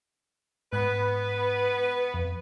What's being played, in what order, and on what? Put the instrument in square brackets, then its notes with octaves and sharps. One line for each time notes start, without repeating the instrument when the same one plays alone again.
[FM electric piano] G#2 F#6 [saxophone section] B3 B4
[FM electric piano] F2